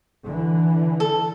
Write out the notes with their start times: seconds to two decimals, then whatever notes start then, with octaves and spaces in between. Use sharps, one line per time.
0.25 D3 E3
1.00 A4